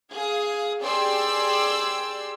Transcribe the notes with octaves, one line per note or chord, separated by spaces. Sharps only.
G#4 F5 D#6
G4 G#4 D5 G5 C6 E6